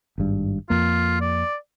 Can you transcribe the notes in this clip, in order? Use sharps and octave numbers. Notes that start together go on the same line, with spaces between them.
G#1 G2
F2 A#3 F4
D5